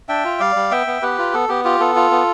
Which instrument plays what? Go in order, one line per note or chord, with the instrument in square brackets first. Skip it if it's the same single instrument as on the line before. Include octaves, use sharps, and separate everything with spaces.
[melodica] D4 E5 G5
F4
G3 D5 F5
G3
B3 E5 G5
B3
B3 G4 B4
F4
B3 A4
B3 G4
F4 G4
B3 A4
F4
B3